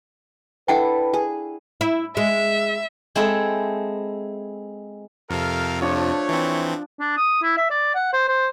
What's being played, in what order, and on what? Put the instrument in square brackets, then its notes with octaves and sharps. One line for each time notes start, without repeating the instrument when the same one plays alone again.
[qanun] D4 E4 A4 [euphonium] B4 [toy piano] F#5 G5
[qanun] G#4
[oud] E4
[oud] G#3 [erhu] E5
[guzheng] G#3 C4 E4 G#4 A4
[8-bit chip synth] F2 C3 [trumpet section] A4 A#4 F5
[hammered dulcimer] F3 D4 [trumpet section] A3 C#5
[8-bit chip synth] E3 C4
[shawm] D4
D#6
E4
E5
D5
F#5
C5
C5